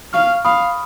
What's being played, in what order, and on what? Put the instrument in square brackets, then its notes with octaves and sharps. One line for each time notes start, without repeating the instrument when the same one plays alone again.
[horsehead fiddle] F5 [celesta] C#6 F6
[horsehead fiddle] F5 [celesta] B5 D#6